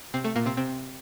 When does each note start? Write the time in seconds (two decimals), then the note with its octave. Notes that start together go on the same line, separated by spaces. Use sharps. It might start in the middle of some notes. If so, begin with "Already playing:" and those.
0.14 C3 C4
0.24 A3
0.36 A#2 A#3
0.45 C3 C4
0.57 C3 C4